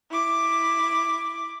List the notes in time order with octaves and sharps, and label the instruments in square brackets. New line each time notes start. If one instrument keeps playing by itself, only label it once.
[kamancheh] E4 D6